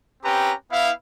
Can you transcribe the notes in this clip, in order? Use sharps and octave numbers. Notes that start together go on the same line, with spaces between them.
C4 C#4 G4 B4 G5 A#5
B3 E4 F5